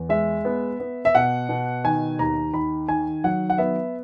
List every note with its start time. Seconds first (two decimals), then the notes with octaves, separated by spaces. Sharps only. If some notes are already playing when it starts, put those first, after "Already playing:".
Already playing: E2
0.09 G#3 E5
0.45 B3
0.80 B3
1.05 E5
1.15 B2 F#5
1.49 B2
1.84 D#3 G#5
2.19 D#2 A#5
2.54 D#3 B5
2.88 D#3 G#5
3.24 F#3 F#5
3.50 F#5
3.58 B3 E5